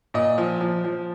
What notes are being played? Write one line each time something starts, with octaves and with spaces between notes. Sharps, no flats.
A#2 D#5
F3
F3
F3